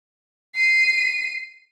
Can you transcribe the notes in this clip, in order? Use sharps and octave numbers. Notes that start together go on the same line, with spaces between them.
C7 D#7